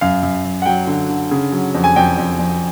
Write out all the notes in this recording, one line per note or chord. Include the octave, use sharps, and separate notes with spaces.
F#2 F5
F#2
F#2
F#5
F#3 G5
D3
D3
C#3
F#3
F2
G#5
F2 G5
F2
F2